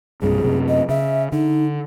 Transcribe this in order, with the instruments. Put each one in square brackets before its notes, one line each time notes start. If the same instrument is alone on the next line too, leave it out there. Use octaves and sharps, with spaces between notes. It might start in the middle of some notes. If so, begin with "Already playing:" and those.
[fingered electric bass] B1 G2 C3 [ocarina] G#4
[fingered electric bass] F#2 C3
[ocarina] D#5
[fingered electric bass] C#3 [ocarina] E5
[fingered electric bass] D3 [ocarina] D#4